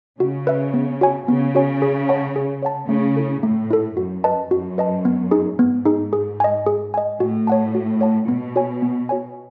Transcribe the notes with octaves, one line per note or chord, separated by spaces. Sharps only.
C#3 F#4
B4 E5
B3
F#4 C#5 G#5
C#3 B3
F#4 C#5 G#5
G#4
C#5 F#5 A5
G#4
C#5 F#5 A5
C#3 A3
E4 A4
A2 A3
E4 A4
F#2 F#4
B4 D#5 A5
F#2 F#4
B4 D#5 A5
B3
D#4 G#4
G#2 B3
D#4 G#4
G#4
D#5 G#5
G#4
D#5 G#5
A2 F#4
C#5 F#5 A5
F#4
C#5 F#5 A5
B2 B3
F#4 C#5 G#5
B3
F#4 C#5 G#5